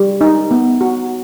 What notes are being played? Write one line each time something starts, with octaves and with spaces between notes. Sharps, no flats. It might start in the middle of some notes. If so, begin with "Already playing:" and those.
Already playing: G3
D#4
B3
F#4